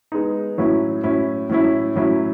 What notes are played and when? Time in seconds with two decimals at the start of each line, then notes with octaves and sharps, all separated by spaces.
0.12 G#3 B3 D#4
0.58 A2 F#3 C#4 E4
1.04 A2 F#3 C#4 E4
1.49 A2 F#3 C#4 E4
1.95 A2 F#3 C#4 E4